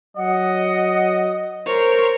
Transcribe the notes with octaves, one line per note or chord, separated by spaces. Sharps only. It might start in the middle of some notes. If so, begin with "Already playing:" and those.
F#3 D#5 F#5
A#4 C5 C#5